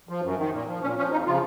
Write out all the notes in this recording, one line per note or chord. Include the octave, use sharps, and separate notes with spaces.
F3
F#2
D#3
A#2
F3
A#2 C#4
F3 C#4
F2 D#4
C#3 F3 F4